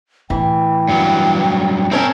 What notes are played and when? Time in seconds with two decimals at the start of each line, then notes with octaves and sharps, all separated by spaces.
0.30 A2 E3 G5
0.89 G2 F#3
1.91 C4 C#4 A#4 C#5 A5